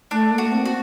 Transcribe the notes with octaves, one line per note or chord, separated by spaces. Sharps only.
A3 D4
A#3
F#4
C4
F#4